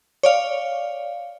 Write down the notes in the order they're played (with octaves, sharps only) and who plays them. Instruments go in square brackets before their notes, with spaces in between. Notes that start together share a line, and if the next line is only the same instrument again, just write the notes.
[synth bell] C#5 D5 F5